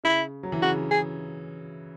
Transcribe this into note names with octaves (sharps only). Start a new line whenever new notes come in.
C#3 E4
F#3
E3
C#3 F#4
G#4